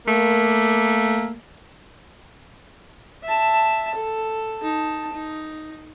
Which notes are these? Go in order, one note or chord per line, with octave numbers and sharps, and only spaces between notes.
A3 A#3
E5 A5
A4
D#4 A5
D#4